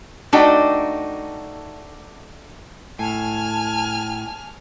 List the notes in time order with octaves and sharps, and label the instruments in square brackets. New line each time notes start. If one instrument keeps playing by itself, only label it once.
[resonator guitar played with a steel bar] A3 D4 D#4 F#4 D5 G5
[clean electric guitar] A2 [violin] G#5 F6 [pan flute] A5